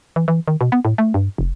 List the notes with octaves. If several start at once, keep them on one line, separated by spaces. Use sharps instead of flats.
E3
E3
D#3
B2
B3
A2
A3
G2
F1